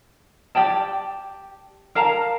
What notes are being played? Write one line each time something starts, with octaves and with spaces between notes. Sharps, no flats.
G4 D5 G5 A5
A#4 F5 A5 A#5